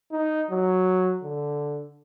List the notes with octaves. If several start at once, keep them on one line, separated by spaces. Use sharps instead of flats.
D#4
F#3
D3